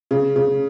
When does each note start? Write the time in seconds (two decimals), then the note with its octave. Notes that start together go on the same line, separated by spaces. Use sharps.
0.11 C#3
0.36 C#3